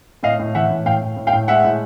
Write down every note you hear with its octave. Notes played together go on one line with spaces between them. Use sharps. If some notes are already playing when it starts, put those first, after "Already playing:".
A2 D#5 F5
A2
E3 E5 F#5
A2
A2 F5 G5
A2
A2
F5 G5
A2
G#3 E5 F#5
A2